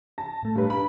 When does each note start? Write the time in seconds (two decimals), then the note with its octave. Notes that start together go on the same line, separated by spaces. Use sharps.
0.18 A5 A#6
0.43 A2 A3
0.55 G2 B4
0.70 D4 G4 B5